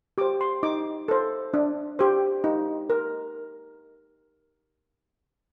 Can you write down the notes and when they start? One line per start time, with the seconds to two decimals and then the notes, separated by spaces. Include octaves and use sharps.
0.18 G4 C5 D6
0.41 C6
0.63 D#4 D6
1.08 A4 C5
1.54 D4
1.99 G4 C5
2.44 D#4
2.90 A#4